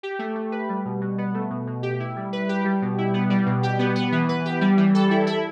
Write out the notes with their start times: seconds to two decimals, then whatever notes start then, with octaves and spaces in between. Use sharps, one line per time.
0.03 G4
0.19 A3
0.36 A3
0.52 B4
0.69 G3
0.85 B2
1.01 B2
1.18 B3
1.34 A3
1.50 B2
1.67 B2
1.83 G4
2.00 E4
2.16 G3
2.33 B4
2.49 G4
2.65 G3
2.82 B2
2.98 E4
3.14 B3
3.30 G3
3.46 B2
3.63 G4
3.79 B3
3.95 B3
4.12 E3
4.29 B4
4.45 G4
4.61 G3
4.77 E3
4.95 A4
5.11 E4
5.27 E4